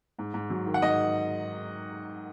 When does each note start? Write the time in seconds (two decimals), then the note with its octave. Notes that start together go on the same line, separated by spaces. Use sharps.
0.19 G#2
0.34 G#2
0.50 F#3
0.66 D#3
0.74 F#5
0.82 G#2 D#5